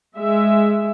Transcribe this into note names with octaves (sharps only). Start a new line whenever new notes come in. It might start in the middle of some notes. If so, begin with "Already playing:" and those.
G#3 E5